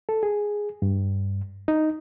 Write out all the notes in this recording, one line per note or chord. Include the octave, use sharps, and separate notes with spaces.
A4
G#4
G2
D#4